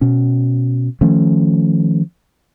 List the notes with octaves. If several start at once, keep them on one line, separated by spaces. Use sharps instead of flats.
B2 C#4
D#3 F3 A3 C#4